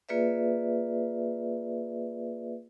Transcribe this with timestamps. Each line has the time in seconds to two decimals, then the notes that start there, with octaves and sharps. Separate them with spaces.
0.09 A#3 F4 G#4 B4 D5 E5